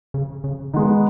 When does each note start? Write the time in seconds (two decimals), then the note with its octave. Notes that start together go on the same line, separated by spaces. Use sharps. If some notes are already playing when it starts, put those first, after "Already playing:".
0.14 C#3
0.44 C#3
0.73 D#3 G#3 B3 D#4